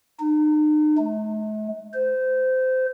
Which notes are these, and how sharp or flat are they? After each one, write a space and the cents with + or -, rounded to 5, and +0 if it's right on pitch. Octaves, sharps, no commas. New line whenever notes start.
D#4 -40
A3 -45
C5 -20